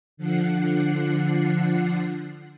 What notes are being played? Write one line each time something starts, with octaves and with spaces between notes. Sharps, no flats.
D3 F3 D4 F#5 C7